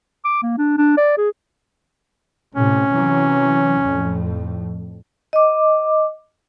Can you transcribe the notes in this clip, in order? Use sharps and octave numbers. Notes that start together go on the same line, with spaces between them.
D6
A#3
D4
D4
D5
G#4
A2 C3 C#4
C3 E3 F#3
F2 A2
D#5 D6